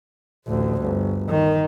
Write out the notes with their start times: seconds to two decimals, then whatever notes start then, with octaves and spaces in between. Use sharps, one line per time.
0.47 A1 D2
0.82 G1
1.29 D#3